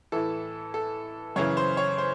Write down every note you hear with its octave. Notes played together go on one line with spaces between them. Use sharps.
A2 E3 A4
A4
F#2 C#3 E3 C#5
C5
C#5
C5